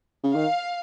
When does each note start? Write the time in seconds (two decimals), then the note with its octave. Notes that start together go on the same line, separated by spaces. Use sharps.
0.23 C#3
0.34 D#3 F5